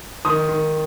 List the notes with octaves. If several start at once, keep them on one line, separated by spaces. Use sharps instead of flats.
D#3 D#6
D#3